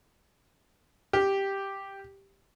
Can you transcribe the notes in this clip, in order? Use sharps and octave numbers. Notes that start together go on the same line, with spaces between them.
G4